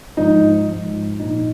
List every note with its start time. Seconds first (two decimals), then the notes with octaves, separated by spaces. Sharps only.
0.17 G#2 F3 D#4
0.68 G#2 F3
1.19 A#2 F3 D#4